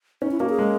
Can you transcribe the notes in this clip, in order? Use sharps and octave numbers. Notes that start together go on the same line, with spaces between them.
C#4 D#4
E4
A#3 F#4
G#4
G#3